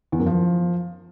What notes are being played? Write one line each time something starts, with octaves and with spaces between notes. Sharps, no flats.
E2
F#2
F3